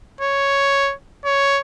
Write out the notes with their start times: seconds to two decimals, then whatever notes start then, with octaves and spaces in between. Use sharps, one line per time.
0.21 C#5
1.25 C#5